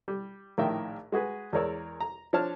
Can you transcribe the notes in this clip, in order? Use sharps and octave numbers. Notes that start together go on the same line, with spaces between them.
G3
A#1 A2 D#3 A#4 E5 G5
G#3 F#4 G#4 B4
E2 G#3 A#4 C#5 D5 E6
A#5
F3 D4 C#5 A5 F6